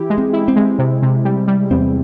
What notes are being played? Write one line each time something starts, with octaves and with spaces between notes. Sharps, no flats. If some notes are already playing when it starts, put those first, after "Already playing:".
Already playing: E3 E4 G4
G#3
C4
E4
C4
G#3
C3
C3
G3
G3
E2 C4